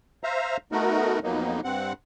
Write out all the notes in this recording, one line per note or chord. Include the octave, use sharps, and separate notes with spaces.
C5 E5 F5 A#5
A3 B3 D#4 F#4 A#4
F2 F#3 A#3 B3 D#4
G2 C4 F#5